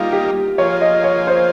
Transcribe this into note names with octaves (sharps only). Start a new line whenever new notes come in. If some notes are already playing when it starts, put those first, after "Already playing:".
Already playing: G3 A#3 D#4 F4
G4
F3 A#3 F4 G#4 C#5
D#5
C#5
C5